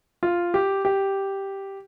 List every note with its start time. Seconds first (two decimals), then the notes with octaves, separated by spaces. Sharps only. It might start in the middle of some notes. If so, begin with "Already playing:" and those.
0.23 F4
0.54 G4
0.85 G4